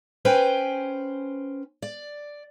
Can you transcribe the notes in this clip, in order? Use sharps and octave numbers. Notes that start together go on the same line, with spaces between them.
C#4 B4 C5 G5 G#5
D5